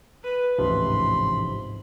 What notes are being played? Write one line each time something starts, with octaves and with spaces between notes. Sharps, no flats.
B4 D#7
A1 D2 G#2 C3 F3 B5 C6